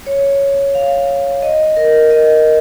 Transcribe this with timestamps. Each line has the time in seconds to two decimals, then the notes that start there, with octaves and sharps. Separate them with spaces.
0.06 C#5
0.75 F5
1.43 D#5
1.77 A#4
2.11 D#5